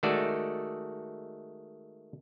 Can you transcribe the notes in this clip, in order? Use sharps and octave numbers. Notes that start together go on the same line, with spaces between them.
D#3 G#3 A3 F#4 A4 D5